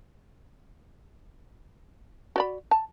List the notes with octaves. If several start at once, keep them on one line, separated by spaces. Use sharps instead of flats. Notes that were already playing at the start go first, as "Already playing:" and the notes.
F#4 D5 B5
A5